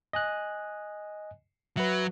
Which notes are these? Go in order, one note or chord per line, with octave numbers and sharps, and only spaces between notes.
D#5 G#5 F#6
F#3 B4 E5